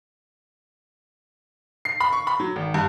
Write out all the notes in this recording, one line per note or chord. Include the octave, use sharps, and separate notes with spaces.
C7
B5
C#6
B5
F#3
G#1
G2